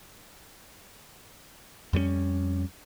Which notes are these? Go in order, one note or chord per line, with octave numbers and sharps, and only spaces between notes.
F2 G3 G#3 C#4